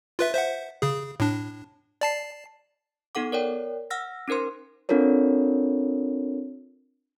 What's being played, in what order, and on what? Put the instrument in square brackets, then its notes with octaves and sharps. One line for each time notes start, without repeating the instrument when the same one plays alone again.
[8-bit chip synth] F4 B4 E5
C5 E5 F#5
C#3 G#4
A2 D4
D5 A5 C7
[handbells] B3 D#4 A4 F#5 D6
A#4 C#5 D5 G5
F#5 E6 F6 A#6
C#4 D#4 A#4 C5 C6
[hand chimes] C4 D4 F4 A4 A#4 C#5